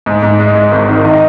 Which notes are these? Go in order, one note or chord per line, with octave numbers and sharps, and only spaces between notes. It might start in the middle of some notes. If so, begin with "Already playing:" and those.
G#2
G#2
G#3
G#3
G#1
D#3
D#3 D#4 D#5